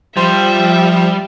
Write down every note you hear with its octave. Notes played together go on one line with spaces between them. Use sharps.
F3 G3 C5 E5 G5 C6